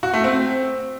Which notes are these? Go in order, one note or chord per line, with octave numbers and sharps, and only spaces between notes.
F#4
A3
C4